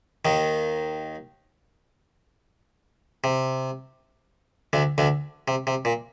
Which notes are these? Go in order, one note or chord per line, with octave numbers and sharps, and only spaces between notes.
D#2 D#3
C3
D2 D3
D2 D3
C3
C3
A#2